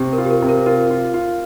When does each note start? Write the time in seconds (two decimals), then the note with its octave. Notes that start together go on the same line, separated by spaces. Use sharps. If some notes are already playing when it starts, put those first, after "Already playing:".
Already playing: C3 G4
0.13 A#4
0.18 F4
0.25 G4
0.30 A#4
0.42 C3
0.49 A#4
0.66 F4 A#4
0.91 F4
1.14 F4